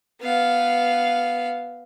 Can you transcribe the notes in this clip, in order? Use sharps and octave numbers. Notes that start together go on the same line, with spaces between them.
B3 F5